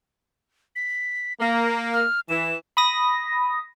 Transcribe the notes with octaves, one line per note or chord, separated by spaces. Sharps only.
B6
A#3 A#5
F6
E3 E7
B5 D#6 A#6